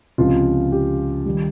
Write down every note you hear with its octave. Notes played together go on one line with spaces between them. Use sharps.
C#2 C3 F3 F4
G4
D#3 G3